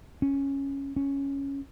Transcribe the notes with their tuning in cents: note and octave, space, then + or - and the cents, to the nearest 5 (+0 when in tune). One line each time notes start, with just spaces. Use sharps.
C#4 -5
C#4 +0